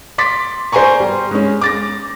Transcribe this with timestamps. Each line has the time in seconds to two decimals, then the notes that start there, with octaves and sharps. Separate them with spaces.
0.18 C6 D6 A6 B6
0.72 C5 D5 G#5 A#5 C#6
1.00 G3
1.31 G#3 C#4
1.62 D6 A6 A#6